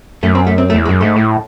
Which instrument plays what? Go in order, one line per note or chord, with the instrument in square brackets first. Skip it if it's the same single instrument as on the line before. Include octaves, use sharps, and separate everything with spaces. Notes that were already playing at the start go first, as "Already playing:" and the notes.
[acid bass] F#2 [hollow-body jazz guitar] A3
[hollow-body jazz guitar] C4
A3
C4
A3
[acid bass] E2
[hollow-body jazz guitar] G#3
[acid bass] F#2
[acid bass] G#2 [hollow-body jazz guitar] A3
[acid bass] A2